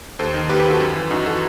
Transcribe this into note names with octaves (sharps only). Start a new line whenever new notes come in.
D#2 A4 C5
D#3
D#2 G4 B4
G4 B4
D#3 F#4 A4
F#2
E3
F#2 D#4 F#4
E3 F#4 A4